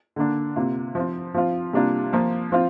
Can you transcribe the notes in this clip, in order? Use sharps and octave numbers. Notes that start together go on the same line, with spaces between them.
D3 A#3 D4
C3 A#3 F4
F3 C4 F4
F3 C4 F4
C3 G3 A#3 D4 F4
F3 A#3 F4
F3 C4 F4